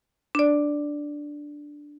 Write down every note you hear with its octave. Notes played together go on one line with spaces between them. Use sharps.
D4 D5